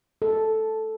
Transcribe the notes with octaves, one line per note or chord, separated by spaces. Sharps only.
A4